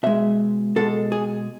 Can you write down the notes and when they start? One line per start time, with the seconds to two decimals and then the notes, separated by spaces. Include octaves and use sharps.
0.03 B2 G#3 E5
0.76 B2 G#3 A4
1.12 G#4